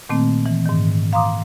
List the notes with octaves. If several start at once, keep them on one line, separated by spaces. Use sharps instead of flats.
A#2 D#3 A3 A#3 C4
E3
G#2 D#3
F5 A#5 C6 D6 D#6